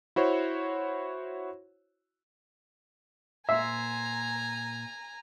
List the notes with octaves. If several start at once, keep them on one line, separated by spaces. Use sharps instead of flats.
E4 F#4 C5 C#5
A#2 C5 E5 G#5 A#5